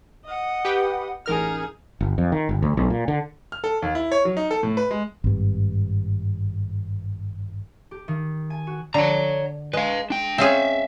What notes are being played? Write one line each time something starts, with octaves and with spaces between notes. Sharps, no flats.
D#5 F#5
G4 B4 G5
A1 D#4 G#4 A#4 F6
G1
F2
D#3
G1
D2
B1
A#2
D3
F6
A4
D#2
E4
C#5
F#3
D#4
A4
A2
B4
G#3
G#1 G2
G4
D#3
G#5
F#4
D3 C#5 A#5
G#3 B4 F5
D4 G5
C4 C#4 G#4 E5 F5